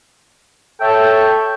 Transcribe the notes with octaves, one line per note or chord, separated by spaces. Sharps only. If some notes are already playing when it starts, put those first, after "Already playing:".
A4 C#5 E5 G5